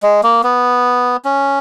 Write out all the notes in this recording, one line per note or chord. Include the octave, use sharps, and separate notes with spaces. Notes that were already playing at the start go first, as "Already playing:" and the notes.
G#3
A#3
B3
C#4